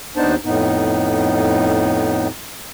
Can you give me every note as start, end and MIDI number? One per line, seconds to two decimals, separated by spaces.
0.17 0.35 39
0.17 0.35 59
0.17 0.35 62
0.17 0.35 63
0.17 0.35 72
0.17 0.35 81
0.45 2.28 41
0.45 2.28 45
0.45 2.28 59
0.45 2.28 63